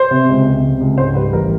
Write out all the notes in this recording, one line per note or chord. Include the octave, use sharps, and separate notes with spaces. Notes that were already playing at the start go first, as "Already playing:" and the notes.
Already playing: C5
C3
C#2
C3
C3
C#2
G#2 C5
G3 B4
A1 A#4